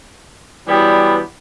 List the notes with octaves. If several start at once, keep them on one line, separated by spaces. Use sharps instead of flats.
E3 F#3 G3 B3 D4 G4